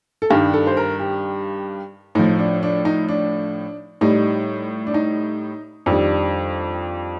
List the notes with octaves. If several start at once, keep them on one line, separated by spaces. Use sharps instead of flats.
A4
G2 D#3 G3 G4
A4
C5
A#4
G4
A2 F3 D#4
D4
D4
D#4
D4
A2 G3 D#4
D4
D#4
F2 D#3 G3 D4